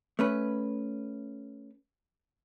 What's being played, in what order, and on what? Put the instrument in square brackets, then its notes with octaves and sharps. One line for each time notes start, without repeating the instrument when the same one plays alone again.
[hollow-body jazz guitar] A3 C#4 B4